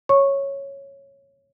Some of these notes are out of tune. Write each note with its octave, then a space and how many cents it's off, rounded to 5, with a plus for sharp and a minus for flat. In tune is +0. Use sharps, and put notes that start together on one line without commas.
C#5 -5 C#6 -10